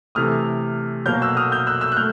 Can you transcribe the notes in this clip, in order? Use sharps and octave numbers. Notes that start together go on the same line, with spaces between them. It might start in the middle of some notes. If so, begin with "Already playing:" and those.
C3 E3 A3 D#6 F6
B2 F#3 A#3 F6 G6
E6 F#6
D#6 F6
F6 G6
E6 F#6
E6 F#6
F#6
A3 F6 G6